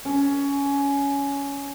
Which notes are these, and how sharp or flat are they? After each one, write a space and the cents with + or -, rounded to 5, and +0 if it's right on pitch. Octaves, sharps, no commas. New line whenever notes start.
C#4 +15